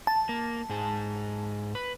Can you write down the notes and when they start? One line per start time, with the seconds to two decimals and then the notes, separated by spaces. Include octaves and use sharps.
0.07 A5
0.29 A#3
0.69 G#2 G#4
1.75 B4